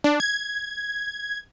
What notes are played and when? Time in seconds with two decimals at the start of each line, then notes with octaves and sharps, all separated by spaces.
0.04 D4
0.20 G#6